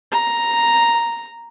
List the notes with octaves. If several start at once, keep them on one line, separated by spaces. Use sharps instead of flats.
A#5